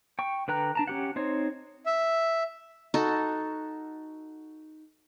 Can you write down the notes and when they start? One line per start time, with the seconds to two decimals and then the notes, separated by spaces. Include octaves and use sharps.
0.19 G5 C#6
0.48 D3 B4 G5 A#5 F#6
0.75 D4 A5 A#5
0.87 C#4 G4 F#5
1.16 C4 D#4 C5 C#5
1.86 E5
2.94 D#4 F#4 A4